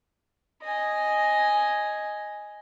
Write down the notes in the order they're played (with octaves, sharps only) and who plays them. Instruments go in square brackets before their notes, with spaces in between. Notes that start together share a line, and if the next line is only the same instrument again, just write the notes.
[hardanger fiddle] D#5 G#5